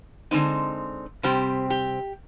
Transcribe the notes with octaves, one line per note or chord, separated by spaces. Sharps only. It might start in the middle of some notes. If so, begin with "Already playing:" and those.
D3 G#3 C4 D#4
C3 G3 C4 G4
G4